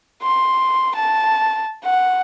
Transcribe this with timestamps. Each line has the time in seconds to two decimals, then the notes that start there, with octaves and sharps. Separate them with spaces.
0.23 C6
0.95 A5
1.84 F#5